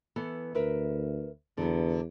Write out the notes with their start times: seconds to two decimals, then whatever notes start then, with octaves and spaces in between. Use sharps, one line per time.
0.16 E3 B3 A4
0.55 D2 A#4 B4 E5
1.57 E2 D3 F#3 B3